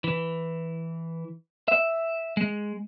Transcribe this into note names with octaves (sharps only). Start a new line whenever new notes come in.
E3
E5
G#3